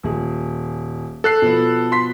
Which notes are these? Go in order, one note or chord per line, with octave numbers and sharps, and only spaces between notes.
D#1 G#4
A4 F#6 C7
B2 F3 B3
C6 B6